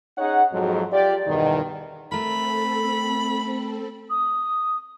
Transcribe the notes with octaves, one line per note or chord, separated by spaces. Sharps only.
C#4 D#4 G#4 C#5 F#5
F2 G#2 F#3 G#3
F4 G4 D5
E2 G2 B2 D#3
A3 C4 A4 A#4 B5
D#6